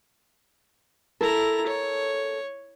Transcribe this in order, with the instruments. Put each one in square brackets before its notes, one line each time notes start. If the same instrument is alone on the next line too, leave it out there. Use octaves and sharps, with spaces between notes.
[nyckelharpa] E4 A#5 [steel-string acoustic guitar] A4 A#4
[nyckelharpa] C#5